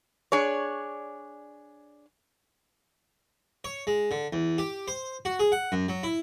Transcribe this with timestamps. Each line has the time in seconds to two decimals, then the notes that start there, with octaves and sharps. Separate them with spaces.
0.32 D4 G#4 C#5
3.64 C#5
3.87 G#3
4.11 D3
4.33 E2
4.58 G4
4.88 C5
5.25 F#4
5.39 G#4
5.52 F#5
5.72 F#2
5.89 F#3
6.03 E4